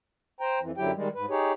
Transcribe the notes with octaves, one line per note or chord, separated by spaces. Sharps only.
C5 G5 A#5
F2 E3
F#2 D3 F#3 E4 G4 G5
D#3 G3 G#3
G#2 B4
D#4 G4 G#4 C#5